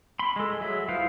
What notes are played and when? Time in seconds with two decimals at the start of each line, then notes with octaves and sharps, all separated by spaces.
0.19 B5 C6
0.36 G#3 A4
0.61 F#3 G#4 E5
0.88 E4 F4 B4 C5 F5